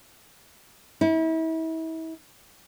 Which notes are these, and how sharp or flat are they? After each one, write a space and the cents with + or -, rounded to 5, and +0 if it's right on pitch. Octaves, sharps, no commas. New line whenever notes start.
E4 -35